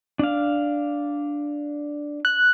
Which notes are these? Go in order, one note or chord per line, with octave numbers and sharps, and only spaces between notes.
D4 F5
F#6